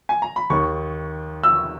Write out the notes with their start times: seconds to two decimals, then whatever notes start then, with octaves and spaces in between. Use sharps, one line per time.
0.09 G#5
0.22 A#5
0.36 B5
0.50 D#2 D#3 C#6
1.43 E6